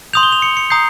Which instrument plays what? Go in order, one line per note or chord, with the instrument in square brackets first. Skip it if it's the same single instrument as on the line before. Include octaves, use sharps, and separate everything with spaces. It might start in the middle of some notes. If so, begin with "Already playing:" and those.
[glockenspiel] C6 D#6 G6 F7
G7
F7
C#7
C#7
A#5 D#6 G6 C7